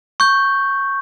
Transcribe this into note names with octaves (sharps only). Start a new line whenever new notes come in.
C#6 G6